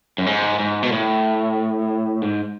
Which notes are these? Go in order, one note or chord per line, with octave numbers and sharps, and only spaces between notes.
F#2
G#2
G#2
B2
A2
G#2